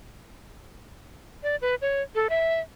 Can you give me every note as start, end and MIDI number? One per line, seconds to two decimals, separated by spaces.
1.43 1.56 74
1.62 1.75 71
1.82 2.02 73
2.15 2.28 69
2.30 2.60 76